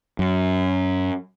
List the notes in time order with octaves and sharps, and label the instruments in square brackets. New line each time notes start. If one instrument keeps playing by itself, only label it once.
[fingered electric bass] F#2